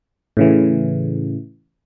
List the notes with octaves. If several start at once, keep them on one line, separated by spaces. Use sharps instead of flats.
A2 C#3 E3